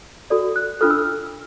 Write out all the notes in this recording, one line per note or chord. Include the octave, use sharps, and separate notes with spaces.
F#4 A4 D5
F#6
D4 F4 A4 F6
E6
F6